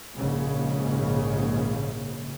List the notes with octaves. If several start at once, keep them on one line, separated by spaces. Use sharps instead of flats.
A#1 G#2 C#3